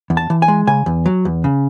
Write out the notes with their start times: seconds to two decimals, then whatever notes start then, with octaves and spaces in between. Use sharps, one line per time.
0.10 E2
0.17 A5
0.30 E3
0.42 G#5
0.48 G#3
0.67 C#3 G#5
0.86 E2
1.06 F#3
1.25 E2
1.44 C#3